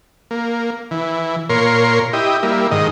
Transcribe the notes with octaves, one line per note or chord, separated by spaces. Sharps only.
A#3
E3
A#2 A#4 C#5 C6
E4 G4 D#5
G3 A#3 E4
G#2 D#3 D#5